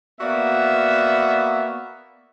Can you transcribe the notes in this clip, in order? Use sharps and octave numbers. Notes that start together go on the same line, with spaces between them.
A#3 B3 F#4 D5 E5